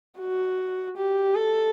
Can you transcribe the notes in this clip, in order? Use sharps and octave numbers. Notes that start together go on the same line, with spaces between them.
F#4
G4
A4